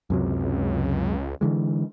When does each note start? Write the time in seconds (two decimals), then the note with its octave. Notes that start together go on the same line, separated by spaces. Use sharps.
0.10 C#2 F#2 C3 F#3
1.41 D3 E3 G#3